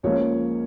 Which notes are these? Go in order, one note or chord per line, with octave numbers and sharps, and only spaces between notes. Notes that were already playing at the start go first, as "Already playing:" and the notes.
C#2 C#3 F3 A#3 C#4 C#5